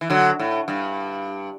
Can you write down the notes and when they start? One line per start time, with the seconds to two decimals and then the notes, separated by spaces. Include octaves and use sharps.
0.01 E3
0.10 D3 F#3
0.39 A2
0.68 G2